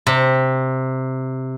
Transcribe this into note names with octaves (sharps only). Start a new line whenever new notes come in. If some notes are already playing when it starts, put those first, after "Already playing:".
C3